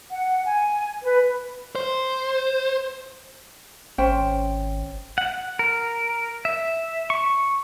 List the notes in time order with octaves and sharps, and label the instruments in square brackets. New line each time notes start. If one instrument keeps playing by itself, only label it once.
[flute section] F#5
G#5
B4
[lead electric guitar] C5
[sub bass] G#1 [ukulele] C#4 C5 G5
[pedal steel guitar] F#5
A#4
E5
C#6